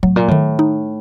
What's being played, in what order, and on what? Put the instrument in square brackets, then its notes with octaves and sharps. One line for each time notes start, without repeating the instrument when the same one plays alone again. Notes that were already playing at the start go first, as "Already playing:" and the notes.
[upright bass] A2 [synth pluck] F#3
[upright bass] A#2
[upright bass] A2 [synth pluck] D#3
[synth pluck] D#4